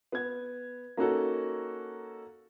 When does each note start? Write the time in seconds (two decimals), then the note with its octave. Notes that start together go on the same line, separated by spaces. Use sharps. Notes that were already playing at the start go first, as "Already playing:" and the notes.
0.12 B3 G#6
0.97 A#3 C#4 D#4 F#4 A4